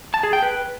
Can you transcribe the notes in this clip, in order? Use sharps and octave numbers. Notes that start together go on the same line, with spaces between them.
A5
G#4
G5
B4